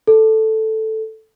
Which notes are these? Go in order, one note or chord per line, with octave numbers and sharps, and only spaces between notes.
A4